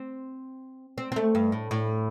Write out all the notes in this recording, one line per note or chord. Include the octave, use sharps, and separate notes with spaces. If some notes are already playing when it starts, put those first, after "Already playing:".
Already playing: C4
C4
C4
A3
G2
A2
A2